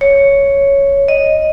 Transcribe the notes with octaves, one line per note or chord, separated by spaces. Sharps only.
C#5
D#5